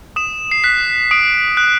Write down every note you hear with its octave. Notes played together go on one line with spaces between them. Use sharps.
D#6 E7
C7
F#6 B6
D#6 D7
F#6